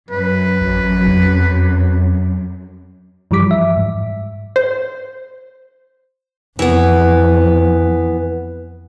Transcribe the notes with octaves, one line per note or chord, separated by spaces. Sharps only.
F#2 B4
A1
F2
G2 E3 F3 G3 D6 B6
E5
G#2
C5
F2 E3 B3